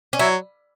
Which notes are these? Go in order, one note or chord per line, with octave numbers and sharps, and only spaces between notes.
C#4
F#3 E4